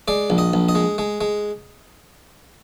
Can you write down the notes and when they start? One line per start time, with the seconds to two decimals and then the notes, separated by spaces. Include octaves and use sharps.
0.08 G#3 D5
0.30 A#1
0.38 D#5
0.53 A#1
0.69 D#5
0.75 G#3
0.98 G#3
1.21 G#3